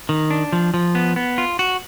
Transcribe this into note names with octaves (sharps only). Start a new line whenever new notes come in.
D#3
D4
F3
F3
B3
B3
F4
F#4